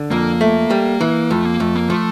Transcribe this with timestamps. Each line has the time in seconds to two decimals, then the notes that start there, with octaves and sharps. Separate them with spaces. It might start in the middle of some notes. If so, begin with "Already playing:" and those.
Already playing: D3
0.11 F2 A#3
0.41 A3
0.71 G3
1.01 E3
1.30 F2 A3
1.45 A#3
1.60 F2 A3
1.75 A#3
1.90 F3 A3